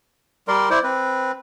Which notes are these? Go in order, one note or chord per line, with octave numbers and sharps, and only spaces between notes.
G3 A#4 D5 C6
E4 C5 D5
C4 B4